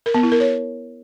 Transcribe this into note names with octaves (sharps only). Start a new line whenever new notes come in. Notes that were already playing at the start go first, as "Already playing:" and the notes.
A#4
B3
E4
A#4
C#5